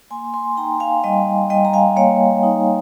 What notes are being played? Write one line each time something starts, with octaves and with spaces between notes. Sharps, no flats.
A#3 G#5 C6
G#5 C6
D#4 G5 A#5
F5 G#5
G3 D#5 G5
G3 D#5 G5
A#5
F5 G#5
A#3 C#5 F5
D#4